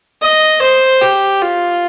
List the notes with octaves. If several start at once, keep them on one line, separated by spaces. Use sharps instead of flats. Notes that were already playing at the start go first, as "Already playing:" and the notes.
D#5
C5
G4
F4